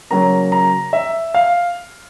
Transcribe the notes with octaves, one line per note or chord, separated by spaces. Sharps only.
C#3 F#3 A#3 C#4 A#5
A#5
E5
F5